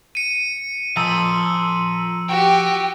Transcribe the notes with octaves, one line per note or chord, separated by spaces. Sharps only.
C#7 D#7
F3 A4 D#5 A#5 C6 E6
F#4 G4 G5